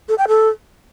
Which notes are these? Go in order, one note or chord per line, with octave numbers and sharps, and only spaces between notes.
A4
G5
A4